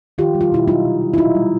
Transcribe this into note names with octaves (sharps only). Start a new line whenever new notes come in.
D#3 F4 G4
G3
F4
B2 E4
F#3 D#4 F4
C3
D#3
E4
A#2 D#4 F4
G3